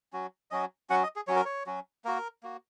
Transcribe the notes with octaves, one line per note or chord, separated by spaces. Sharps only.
F#3 C#4 F#4
F#3 C#4 F#4 D#5
F#3 C#4 F#4 F#5
D#5
G#4
F#3 C#4 F#4 C#5
A#4
C#5
F#3 C#4 F#4
A#3 F#4 A#4
A#3 F#4